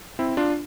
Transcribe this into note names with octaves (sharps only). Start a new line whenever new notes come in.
C4 E4
D4 F4